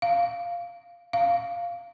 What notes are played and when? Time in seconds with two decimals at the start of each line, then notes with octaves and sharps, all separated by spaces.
0.02 F5
1.13 F5